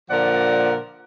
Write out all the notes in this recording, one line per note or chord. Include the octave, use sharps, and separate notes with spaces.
A#2 D3 F3 A#4 D5 F#5